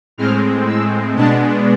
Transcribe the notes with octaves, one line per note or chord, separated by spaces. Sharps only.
A2 G#3 C4 F6
E6
B2 G#3 B3 D4 A5